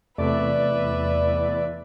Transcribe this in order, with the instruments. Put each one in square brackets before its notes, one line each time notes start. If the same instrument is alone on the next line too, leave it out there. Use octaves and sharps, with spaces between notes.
[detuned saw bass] E2 [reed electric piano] C3 A3 [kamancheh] B4 E5 [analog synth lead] D5